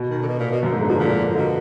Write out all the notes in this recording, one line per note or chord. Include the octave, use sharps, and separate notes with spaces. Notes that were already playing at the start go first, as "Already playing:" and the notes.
Already playing: B2
D#3
D3
B2
A#2
B2
F#2
G#2
D3
B2 F3
A#2
F3
B2 D3